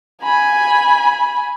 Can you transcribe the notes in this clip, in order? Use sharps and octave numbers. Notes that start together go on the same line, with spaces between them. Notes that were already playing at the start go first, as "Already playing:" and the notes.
G#5 B5